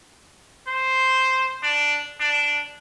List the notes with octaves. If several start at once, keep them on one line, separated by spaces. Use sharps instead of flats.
C5
D4
D4